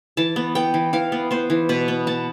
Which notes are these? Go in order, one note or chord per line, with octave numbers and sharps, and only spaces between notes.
E3 A5
B3
B3 G5
E3
E3 F5
B3
B3 C5
E3
B2 B4
B3
B3 A5